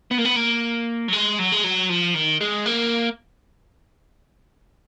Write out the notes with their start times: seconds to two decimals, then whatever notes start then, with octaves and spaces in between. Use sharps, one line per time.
0.11 B3
0.18 A#3
0.25 B3
0.36 A#3
1.08 F#3
1.13 G#3
1.39 F#3
1.52 G#3
1.64 F#3
1.89 F3
2.15 D#3
2.41 G#3
2.66 A#3